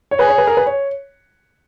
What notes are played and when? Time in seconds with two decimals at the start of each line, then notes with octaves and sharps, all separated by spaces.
0.11 C#5
0.19 G#4 B4
0.28 C#5
0.38 B4
0.47 A#4
0.57 B4
0.66 C#5